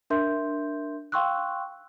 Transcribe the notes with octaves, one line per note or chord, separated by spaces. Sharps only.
D4 A#4 E5 C6 G6
F5 G5 C6 C#6 E6 F#6